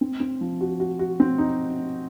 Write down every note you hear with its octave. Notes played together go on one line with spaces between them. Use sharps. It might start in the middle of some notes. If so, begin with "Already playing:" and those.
C4
C4
F3
F#4
F#4
F#4
C4
D#4